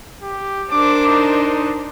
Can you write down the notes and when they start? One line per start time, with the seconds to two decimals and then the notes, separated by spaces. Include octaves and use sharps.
0.22 G4
0.71 D4 A#4 C5 D6
1.07 D#4